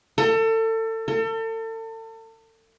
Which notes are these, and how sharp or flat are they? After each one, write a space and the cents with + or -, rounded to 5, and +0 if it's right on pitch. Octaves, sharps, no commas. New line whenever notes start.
A4 +30
A4 +35